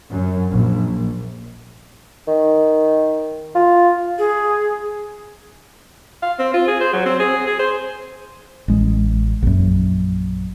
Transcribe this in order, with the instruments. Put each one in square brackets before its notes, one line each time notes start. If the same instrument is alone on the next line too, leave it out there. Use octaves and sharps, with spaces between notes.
[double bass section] F#2
A#1
[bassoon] D#3
F4
[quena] G#4
[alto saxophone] F5
C4
F4
G#4
C5
F#3
C4
G#4
G#4
C5
[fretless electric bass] A1 G#3
A#1 F#2